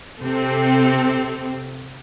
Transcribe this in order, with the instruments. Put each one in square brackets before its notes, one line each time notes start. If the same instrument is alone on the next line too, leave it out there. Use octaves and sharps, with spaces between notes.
[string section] C3 C4 A4